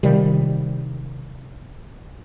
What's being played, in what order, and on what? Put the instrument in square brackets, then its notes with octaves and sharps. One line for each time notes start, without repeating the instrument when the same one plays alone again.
[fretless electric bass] C3 D#3 F3 G3